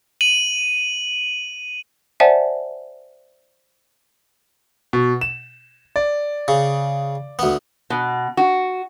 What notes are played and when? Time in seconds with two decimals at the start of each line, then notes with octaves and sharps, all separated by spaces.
0.21 D#7 F#7
2.20 C5 D5 E5 F#5 G#5 A5
4.93 B2
5.21 E7
5.96 D5
6.48 C#3
7.39 D2 B3
7.90 B2
8.37 F#4